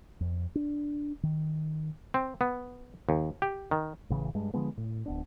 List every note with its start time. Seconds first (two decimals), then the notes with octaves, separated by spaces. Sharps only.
0.21 F2
0.55 D4
1.23 D#3
2.14 C4
2.41 B3
3.09 D#2
3.42 G4
3.71 D#3
4.10 A1 C#3 E3
4.35 G2 G#3
4.54 D3 F3 G#3 B3
4.77 A2
5.06 D1 B3 D4